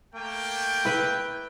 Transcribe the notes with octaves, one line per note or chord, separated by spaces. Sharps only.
A3 A#3 G5
E4 B4